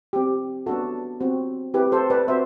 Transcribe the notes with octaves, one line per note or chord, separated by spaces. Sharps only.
C4 G4
B3 D4 F#4 A4
C4 F#4
C4 E4 G4 B4
A4 C5
B4 D5
C4 F#4 C5 E5